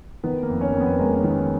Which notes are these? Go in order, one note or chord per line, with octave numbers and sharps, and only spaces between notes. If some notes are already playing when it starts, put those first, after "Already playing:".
D#3 B3 B4
A#3 A#4
F2
C#4 C#5
F2 A#4
B3 B4
B4
G#3 A#3 A#4
C#4
D#3 B3